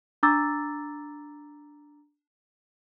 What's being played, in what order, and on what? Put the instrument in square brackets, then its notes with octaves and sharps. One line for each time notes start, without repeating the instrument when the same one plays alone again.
[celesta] D4 A#5 D6 E6 A6